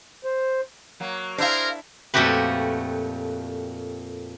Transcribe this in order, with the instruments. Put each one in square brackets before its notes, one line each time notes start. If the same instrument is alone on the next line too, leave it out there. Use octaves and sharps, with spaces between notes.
[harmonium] C5
[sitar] F#3 A#3
[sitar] D4 E4 E5 [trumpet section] G#4 A#4 [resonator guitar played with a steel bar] C5 F5
[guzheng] F2 A#2 A3 F#4 G4 B4